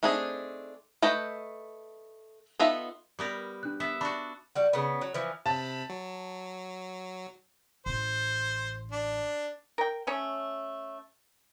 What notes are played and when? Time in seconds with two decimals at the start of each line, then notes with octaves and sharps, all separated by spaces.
0.03 A3 C4 D4 D#4 G#4
1.02 A3 B4 D#5 G5
2.59 B3 D#4 F4 A4 E5
3.19 G3 B3 A#4
3.63 D4 F#6
3.80 B3 E5
4.01 D4 F#4 B5
4.55 G3 F#4
4.73 C#3 B3
5.01 F#3
5.14 E3 F3
5.46 C3 A5 B5
5.90 F#3
7.86 A1 C5
8.92 D4
9.78 A#4 G5
10.07 A3 C#4 C#5